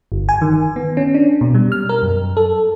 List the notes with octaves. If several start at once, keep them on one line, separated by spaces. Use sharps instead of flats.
G1
G#5
D#3
B3
C#4
D4
B2
G3
F6
A#4
F#2
A4